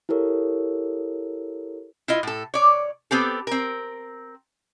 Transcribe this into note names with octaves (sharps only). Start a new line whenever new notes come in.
E4 G4 A4 A#4 C#5
E4 F4 D#5
A2 A4
C#5 D5
B3 C4 G4 A4
C4 A#4